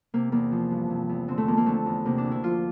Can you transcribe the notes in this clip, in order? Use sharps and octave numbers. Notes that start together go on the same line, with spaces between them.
C3 A#3
E2 A#3
F3
G2
C3
E2
D3 C4
A3
F2 A#3
A#3
D3 A3
E2
C3 A#3
D4
D2
E4
F3 F4